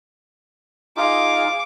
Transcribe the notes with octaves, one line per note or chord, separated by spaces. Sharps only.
D#4 F4 G#4 F5 D6